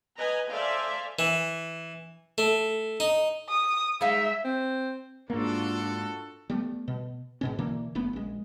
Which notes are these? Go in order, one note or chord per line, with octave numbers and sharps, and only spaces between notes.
B4 D#5 G#5 A#5
A4 C5 D5 E5 F5 G#5
E3
A3
D#4
D#6
G#3 D#4 E5 F5
C4
G#2 A#3 D4 F4 F#4 A4
G3 A3 B3
B2
G#2 B2 C#4
B2 D3 E3 A#3
F#1 A3 B3 C#4
A#1 G#3